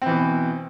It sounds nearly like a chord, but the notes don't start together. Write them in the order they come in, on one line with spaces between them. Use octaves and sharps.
C4 E3 B2